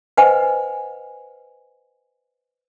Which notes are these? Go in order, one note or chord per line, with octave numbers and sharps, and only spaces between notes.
B4 C5 D#5 F#5 G#5